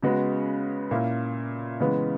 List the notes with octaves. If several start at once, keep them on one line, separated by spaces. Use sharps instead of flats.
C#3 G#3 B3 F#4
A#2 A#3 C#4 E4
C#3 E3 G#3 B3